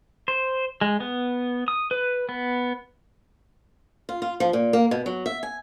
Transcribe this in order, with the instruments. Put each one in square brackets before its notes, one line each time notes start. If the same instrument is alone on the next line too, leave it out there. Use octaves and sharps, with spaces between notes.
[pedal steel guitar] C5
G#3
B3
D#6
B4
B3
[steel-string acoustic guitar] F4
F4
F3
A#2
A#3
B2
F#3
E5
G#5